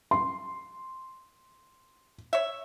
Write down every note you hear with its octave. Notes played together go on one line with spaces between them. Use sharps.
C6
C#5 E5